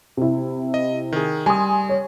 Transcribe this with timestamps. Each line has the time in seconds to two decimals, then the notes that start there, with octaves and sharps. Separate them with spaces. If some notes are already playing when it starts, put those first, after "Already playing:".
0.17 C3 E4
0.74 D#5
1.12 D#3 G#4
1.46 G3 G#5 C6 D#6
1.89 C#5